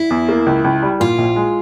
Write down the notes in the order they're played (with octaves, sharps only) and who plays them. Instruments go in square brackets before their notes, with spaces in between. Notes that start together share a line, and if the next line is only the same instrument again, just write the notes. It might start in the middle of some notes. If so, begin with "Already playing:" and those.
Already playing: [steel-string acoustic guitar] E4
[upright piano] E2
A#3
C#2
C#2
G3
[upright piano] A#2 [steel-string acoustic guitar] F4
[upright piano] A#1
G#3